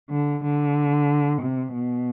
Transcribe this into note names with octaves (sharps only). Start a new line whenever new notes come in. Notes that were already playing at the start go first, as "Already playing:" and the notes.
D3
D3
C3
B2